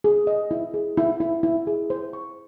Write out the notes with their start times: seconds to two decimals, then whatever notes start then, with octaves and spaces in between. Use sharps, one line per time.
0.04 G#4
0.27 D#5
0.51 E4
0.74 G#4
0.97 E4
1.20 E4
1.43 E4
1.67 G#4
1.90 C5
2.13 C#6